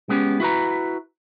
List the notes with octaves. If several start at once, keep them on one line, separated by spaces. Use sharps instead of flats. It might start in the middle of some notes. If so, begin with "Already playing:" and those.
G#3 B3 C#4 G4
E4 F#4 B4 A#5